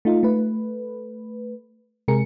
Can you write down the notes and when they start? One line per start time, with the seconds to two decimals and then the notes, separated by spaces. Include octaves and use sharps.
0.05 A3 D#4 F4
0.23 A3 B4
2.08 C3 G#3 G#4 A#4 C#7